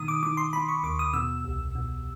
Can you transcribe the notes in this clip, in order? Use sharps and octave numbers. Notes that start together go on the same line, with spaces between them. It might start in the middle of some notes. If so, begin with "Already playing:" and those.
Already playing: B2 D#3 D#6
D6
D#3 D6
C6
D#3 B5
C#6
D#2 D6
D#6
B2 E6
C2
B2